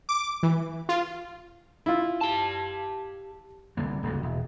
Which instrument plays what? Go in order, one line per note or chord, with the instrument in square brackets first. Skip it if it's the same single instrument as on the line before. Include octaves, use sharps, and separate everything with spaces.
[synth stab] D6
E3
F4
[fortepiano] E4 F4
[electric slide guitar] G4 A5
[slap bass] C2 D3 A#3
D#1 C#2 G2
E1